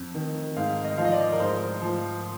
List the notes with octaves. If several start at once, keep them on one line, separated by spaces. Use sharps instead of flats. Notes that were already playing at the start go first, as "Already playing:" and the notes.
Already playing: F2
D#3
G#2 F5
D#5
F3 F5
D#5
D5
A#4
G#2 C5
F3